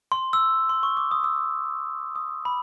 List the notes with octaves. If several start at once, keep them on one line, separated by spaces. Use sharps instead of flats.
C6
E6
C6
C#6
D6
D#6
E6
D#6
B5